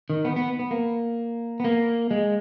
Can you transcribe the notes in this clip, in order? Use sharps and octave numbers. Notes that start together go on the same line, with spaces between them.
D#3
B3
B3
B3
A#3
B3
A#3
G#3